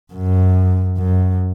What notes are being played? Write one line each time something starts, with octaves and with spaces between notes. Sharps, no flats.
F#2
F#2